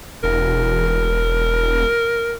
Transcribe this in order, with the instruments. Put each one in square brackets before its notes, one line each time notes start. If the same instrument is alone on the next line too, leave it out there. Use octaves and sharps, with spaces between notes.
[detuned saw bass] E1 [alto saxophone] A#4